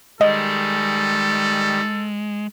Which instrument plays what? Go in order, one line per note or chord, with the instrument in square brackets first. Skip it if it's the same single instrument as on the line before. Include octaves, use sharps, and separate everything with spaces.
[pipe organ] D#3 G3 [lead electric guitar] G#3 [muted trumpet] A4 [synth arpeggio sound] D#5